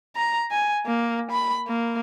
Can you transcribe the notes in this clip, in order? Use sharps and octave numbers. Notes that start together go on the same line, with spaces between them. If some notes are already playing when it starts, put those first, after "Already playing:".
A#5
G#5
A#3
B5
A#3